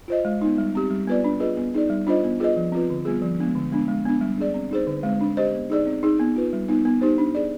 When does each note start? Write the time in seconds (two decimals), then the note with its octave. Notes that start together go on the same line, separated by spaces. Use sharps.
0.08 F4 C5 D#5
0.25 G#3
0.41 B3 D#4
0.58 G3
0.75 C4 G4
0.91 G3
1.07 B3 F4 B4 D5
1.24 D4
1.40 F4 G#4 B4 D#5
1.57 B3
1.74 D#4 G#4 D5
1.90 G3
2.07 D4 F4 C5 D#5
2.24 B3
2.40 F4 G#4 B4 D#5
2.56 F3
2.72 C4 F4 B4
2.90 D3
3.05 G3 B3 F4 G#4
3.22 F3
3.39 G#3 B3 D4
3.55 D3
3.72 G#3 B3 D4
3.88 G#3
4.05 B3 D4
4.21 G3
4.38 D4 G#4 D5
4.54 C4
4.71 D#4 G#4 C5
4.87 D3
5.03 G#3 C4
5.21 D4
5.37 G4 C5 D#5
5.53 B3
5.70 D#4 G#4 D5
5.87 C4
6.03 D#4 G#4
6.20 B3
6.36 F4 B4
6.53 G3
6.68 B3 D#4
6.85 B3
7.02 D#4 G4 C5
7.18 D4
7.35 G#4 D5